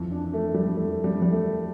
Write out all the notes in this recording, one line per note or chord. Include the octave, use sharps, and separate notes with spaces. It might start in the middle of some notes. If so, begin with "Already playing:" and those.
Already playing: F2 E3
D4
A3
G3
F2 E3 A3
G3
G3
A3